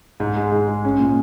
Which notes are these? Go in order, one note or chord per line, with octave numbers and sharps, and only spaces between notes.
G#2
G#3
G#2
G#3
C#4
A#2